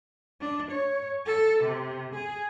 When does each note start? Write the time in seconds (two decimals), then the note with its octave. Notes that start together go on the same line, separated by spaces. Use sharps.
0.41 D4
0.72 C#5
1.26 A4
1.64 C3
2.15 G#4